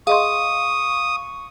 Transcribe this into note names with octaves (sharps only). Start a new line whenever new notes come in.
G#4 D#5 F5 C6 C#6 D#6